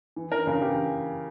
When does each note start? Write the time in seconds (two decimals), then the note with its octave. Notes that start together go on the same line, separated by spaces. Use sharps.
0.16 E3
0.32 E3 A#4
0.47 C#3 A#4
0.62 E3 G4